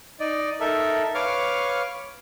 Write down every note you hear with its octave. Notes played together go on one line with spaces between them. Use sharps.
D#4 D5 D#5
D#4 A4 A#4 E5
B4 C#5 F5 C#6 D6 F6